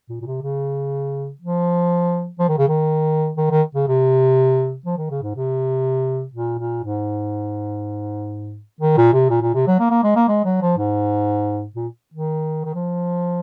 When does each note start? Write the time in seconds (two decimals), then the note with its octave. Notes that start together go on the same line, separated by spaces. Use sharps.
0.09 A#2
0.21 A#2
0.26 C3
0.42 C#3
1.41 F3
2.39 F3
2.48 D#3
2.58 C#3
2.68 D#3
3.37 D#3
3.51 D#3
3.75 C#3
3.88 C3
4.86 F3
4.98 D#3
5.11 C#3
5.22 G#2
5.36 C3
6.34 A#2
6.59 A#2
6.84 G#2
8.81 D#3
8.97 A#2
9.13 C3
9.30 A#2
9.42 A#2
9.55 C3
9.67 F#3
9.80 A#3
9.91 A#3
10.03 G#3
10.16 A#3
10.29 G#3
10.45 F#3
10.62 F3
10.78 G#2
11.76 A#2
12.14 D#3
12.65 D#3
12.74 F3